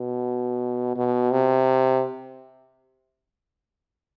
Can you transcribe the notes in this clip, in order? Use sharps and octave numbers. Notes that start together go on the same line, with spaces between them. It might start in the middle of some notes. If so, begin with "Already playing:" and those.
Already playing: B2
B2
C3